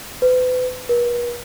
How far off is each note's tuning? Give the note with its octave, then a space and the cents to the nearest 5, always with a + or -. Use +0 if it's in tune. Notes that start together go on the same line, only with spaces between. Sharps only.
B4 +40
B4 -45